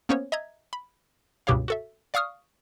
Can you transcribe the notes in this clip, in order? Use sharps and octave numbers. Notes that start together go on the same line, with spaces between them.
A#3 B3 C#4 C5 C#5
D#5 E5 A#5 G#6
B5
C#2 G2 B2 G4 C#5 F5
F#4 A4 E5
D5 F5 C#6 D#6 F6